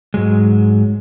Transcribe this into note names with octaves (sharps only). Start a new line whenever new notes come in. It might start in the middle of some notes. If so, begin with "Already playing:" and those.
G#2 F#3 G#3